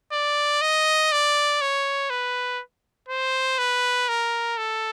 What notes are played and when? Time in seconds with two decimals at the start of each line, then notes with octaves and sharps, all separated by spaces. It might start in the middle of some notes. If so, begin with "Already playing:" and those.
0.12 D5
0.61 D#5
1.12 D5
1.62 C#5
2.10 B4
3.09 C5
3.58 B4
4.09 A#4
4.57 A4